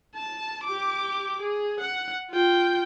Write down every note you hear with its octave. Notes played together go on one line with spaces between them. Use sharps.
A5
G4 D6
G#4
F#5
F4 G5